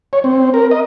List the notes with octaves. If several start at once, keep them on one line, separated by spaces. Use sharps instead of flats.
C#5
C4
A#4
D#5